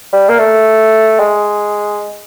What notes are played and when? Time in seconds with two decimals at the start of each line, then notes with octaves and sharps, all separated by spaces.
0.13 G3
0.29 A#3
0.39 A3
1.20 G#3